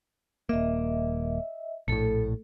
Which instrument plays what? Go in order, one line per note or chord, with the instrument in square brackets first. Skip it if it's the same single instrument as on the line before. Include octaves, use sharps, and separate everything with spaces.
[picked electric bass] D#1 A#3 [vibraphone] D#5 E5
[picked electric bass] A#1 A2 [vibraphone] A3 A4